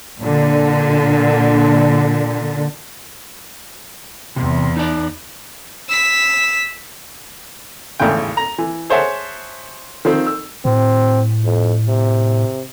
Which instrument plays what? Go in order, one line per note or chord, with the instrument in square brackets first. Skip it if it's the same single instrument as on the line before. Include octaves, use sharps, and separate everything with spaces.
[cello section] A#2 D3
[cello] E2 [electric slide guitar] C3
[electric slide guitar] D#4 D5
[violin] E6 B6
[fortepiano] G#1 E2 A2 C#3 G5
A#5
E3
G#4 C5 C#5 E5 F#5 A5
D#3 F3 C4
E6
[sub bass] A2 [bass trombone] C4
[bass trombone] F2
C3